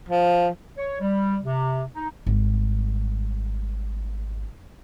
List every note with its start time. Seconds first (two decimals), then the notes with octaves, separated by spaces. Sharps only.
0.08 F3
0.78 C#5
1.01 G3
1.43 C3
1.94 D#4
2.26 G#1 G3